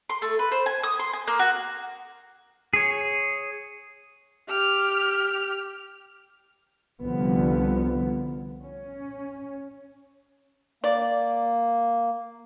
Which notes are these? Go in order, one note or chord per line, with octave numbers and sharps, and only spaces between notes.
C6
A3
B4
C5
G#5
D#6
C6
G#5
A#3
F#4
G#4 C#5
G4 F6
C2 D3 F3 B3
C#4
A#3 D5